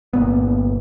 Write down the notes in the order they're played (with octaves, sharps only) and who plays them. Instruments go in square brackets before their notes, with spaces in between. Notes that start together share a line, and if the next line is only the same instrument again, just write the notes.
[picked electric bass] G1 A#2 B3